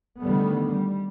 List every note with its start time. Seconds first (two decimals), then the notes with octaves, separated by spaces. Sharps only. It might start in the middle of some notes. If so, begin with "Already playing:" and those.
0.21 D3 D#3 G3 A3 B3
0.64 G3